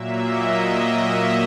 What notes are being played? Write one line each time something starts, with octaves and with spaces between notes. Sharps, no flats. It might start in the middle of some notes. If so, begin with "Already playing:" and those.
Already playing: A#2 F#3 A#3 E5
D#5